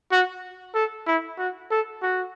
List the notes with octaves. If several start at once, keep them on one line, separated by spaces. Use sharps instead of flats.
F#4
A4
E4
F#4
A4
F#4